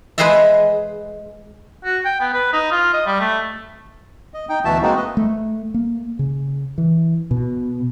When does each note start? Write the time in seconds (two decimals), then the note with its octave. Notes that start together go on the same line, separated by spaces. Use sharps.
0.18 G#3 G#4 B4 C5 D#5 E5
1.85 F#4
2.05 G5
2.20 B3
2.34 B4
2.53 D#4
2.72 F4
2.93 D#5
3.07 G3
3.20 A3
4.34 D#5
4.49 D#4 G5
4.65 D2 B2 E3 F#4 E5 A5
4.82 G#3 A#3 C4 D#4 F#4
4.96 B4 D#5
5.17 A3
5.74 A#3
6.19 C#3
6.78 E3
7.31 B2